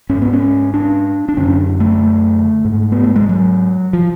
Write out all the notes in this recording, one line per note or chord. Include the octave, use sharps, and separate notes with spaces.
G#2 C#4
B3
C#4
D4
D4
F#2 D3 C#4
A3
G#2
B3
A3
G#3
F#3
F3